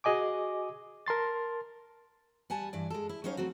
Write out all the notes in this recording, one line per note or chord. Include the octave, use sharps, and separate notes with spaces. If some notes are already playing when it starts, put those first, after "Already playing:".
F#4 G#4 D#5 G#5 D6
A#4 A5 C6 A6
G3 F#5 G#5 A5
G2 E3 D5
G#3 A4
E4
F#3 C#4 D#4 C5 C#5 F5
F#3 A3 C4 F#4